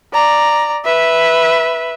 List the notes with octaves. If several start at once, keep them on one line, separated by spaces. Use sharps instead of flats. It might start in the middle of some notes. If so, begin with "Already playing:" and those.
D5 A#5
B4 E5